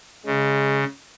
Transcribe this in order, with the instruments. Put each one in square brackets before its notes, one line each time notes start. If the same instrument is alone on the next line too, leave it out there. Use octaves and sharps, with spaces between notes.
[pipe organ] C#3 [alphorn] G#3